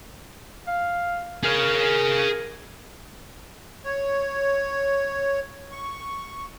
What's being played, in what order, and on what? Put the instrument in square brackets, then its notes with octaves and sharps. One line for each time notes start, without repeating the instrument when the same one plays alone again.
[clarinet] F5
[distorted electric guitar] G#4 F5 [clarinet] A#4
[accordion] C#5
C#6